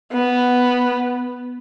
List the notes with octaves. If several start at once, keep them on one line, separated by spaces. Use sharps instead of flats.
B3